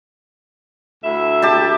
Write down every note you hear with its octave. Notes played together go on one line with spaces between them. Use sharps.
D2 E4 E5
G4 A5